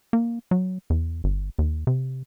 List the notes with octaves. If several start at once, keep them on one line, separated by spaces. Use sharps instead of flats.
A#3
F#3
E2
G1
D#2
C3